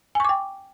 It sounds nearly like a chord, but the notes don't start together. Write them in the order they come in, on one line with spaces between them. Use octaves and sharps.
G#5 C#6 D6 G5